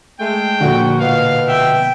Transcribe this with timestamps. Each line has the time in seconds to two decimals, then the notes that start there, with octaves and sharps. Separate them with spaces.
0.20 G#3 A3 G5
0.61 A#2 D3 F3 F#4
1.00 B2 F5
1.48 E5 G5